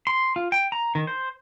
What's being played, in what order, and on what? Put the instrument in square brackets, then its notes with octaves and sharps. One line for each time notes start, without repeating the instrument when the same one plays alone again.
[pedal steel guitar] C6
F4
G5
A#5
D#3
C5